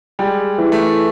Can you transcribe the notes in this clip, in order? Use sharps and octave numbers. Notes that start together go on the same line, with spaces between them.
G3 G#3
E3
A3